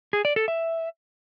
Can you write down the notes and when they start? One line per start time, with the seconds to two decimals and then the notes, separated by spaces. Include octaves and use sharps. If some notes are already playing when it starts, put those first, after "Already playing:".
0.13 G#4
0.25 D5
0.36 A4
0.48 E5